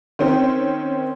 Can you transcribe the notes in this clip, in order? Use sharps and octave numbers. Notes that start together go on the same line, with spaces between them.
D#3 C4 C#4 C5